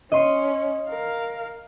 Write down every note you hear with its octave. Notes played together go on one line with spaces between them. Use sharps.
C#4 D#5 C6 D#7
A#4 F5